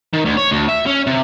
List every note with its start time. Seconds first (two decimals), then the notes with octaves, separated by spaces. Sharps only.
0.14 D#3
0.25 D2
0.37 C#5
0.52 D2
0.69 E5
0.87 C#4
1.07 C3